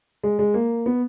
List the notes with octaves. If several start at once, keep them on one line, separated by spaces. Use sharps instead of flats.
G#3
G#3
A#3
B3